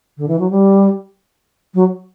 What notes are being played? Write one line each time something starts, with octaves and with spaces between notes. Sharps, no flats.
D3
E3
F#3
G3
F#3